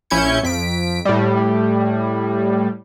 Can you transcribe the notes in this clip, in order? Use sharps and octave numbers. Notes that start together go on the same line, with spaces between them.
A#1 C#4 E4 G6 G#6 C#7
F2 B6 D7
A2 G3